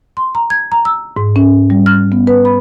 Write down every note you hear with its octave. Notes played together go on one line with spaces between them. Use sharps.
C6
A#5
G#6
A#5
E6
G#2
C#4
G3
F6
B3
B4
B5